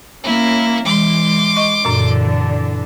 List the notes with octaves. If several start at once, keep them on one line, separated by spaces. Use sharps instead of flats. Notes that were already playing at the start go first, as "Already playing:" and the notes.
A#3 C#4 E4
E3 G#3 C6 D6
D#5 C#6
F#2 A#2 D3 E3 D4